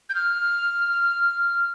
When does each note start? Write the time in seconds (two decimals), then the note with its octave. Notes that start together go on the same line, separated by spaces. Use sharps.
0.09 G6
0.15 F6